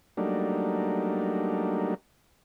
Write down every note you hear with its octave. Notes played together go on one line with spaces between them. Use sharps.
F#3 G3 A3 A#3 D4 D#4